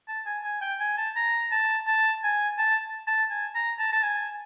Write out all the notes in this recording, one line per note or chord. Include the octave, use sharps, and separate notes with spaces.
A5
G#5
G#5
G5
G#5
A5
A#5
A5
A5
G#5
A5
A5
G#5
A#5
A5
A5
G#5